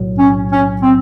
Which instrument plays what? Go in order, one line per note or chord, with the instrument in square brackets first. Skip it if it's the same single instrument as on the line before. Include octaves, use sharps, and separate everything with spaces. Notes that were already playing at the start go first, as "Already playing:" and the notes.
Already playing: [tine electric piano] B1 A2 F#3
[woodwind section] C#4
C#4
C4